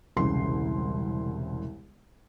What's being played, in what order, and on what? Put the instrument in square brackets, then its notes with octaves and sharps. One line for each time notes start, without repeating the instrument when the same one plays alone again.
[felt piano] E1 C2 C#3 C6 C7